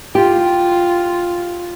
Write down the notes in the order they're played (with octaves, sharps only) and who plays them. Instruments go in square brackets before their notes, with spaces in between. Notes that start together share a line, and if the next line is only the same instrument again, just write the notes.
[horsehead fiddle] F4 [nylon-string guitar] G4